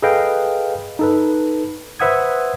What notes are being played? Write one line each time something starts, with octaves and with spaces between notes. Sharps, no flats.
G#4 A4 B4 D#5 F5 G5
D#4 A4 B4
B4 C5 E5 F#5 D#6 G#6